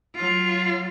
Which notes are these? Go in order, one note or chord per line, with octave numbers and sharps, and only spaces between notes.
F#3 F4